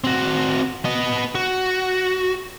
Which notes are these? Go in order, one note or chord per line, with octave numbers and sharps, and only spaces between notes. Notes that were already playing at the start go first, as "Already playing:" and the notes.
C4 F#4
B3 D#5
F#4